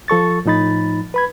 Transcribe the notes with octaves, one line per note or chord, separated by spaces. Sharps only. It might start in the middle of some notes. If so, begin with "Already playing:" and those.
F3 A4 C#6 A6
A2 F3 D#4 B5 A6
B4 B5 G#6